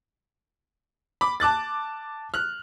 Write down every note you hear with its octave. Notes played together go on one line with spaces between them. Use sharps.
B5 D6
A5 D6 F#6 A6
F6 F#6